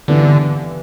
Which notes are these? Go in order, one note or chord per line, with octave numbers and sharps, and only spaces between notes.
G2 D3 E3 B3 D4